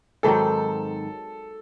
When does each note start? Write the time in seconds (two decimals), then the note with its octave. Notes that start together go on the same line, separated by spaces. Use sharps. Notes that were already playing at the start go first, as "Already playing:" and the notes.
0.23 G#2 D#3 F#3 C4 A4